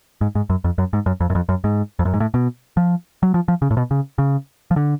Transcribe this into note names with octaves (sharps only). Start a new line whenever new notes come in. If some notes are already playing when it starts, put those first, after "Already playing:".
G#2
G#2
F#2
F2
F#2
G#2
F#2
F2
F#2
F2
F#2
G#2
F2
F#2
G#2
A2
B2
F3
F#3
F3
F3
C#3
A2
B2
C#3
C#3
F3
D3